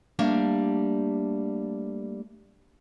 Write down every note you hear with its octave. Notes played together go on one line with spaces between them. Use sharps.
G3 A3 A#3 D4